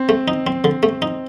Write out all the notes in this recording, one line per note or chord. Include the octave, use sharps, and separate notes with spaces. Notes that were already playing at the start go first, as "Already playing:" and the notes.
Already playing: C4
A3
D#4
C4
D3
A3
D#4